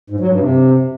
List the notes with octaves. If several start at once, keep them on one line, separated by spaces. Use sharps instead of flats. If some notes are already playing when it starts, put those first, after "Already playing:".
G#2
F#3
G2
C3